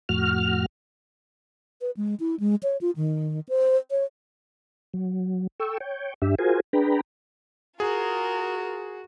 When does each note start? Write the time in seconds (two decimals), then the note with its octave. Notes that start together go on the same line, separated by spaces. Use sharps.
0.09 F2 A2 F#4 F6
1.81 B4
1.97 G#3
2.20 E4
2.40 G#3
2.63 C#5
2.81 F4
2.96 D#3
3.49 C5
3.91 C#5
4.94 F#3
5.60 A4 G5 C#6 E6
5.80 C#5 G5
6.22 G2 D4 G4 E5
6.38 F4 F#4 G#4 A#4 C5 G#5
6.73 D4 G#4 B4 G5 A#5 B5
7.80 F4 F#4 G#4 A#4